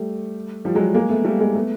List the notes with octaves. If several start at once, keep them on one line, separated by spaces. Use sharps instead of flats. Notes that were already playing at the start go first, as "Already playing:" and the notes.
Already playing: G3 A3
F3 G3
F#3 G#3
G#3 A#3
A3 B3
G3 A3
G#3 A#3
A3 B3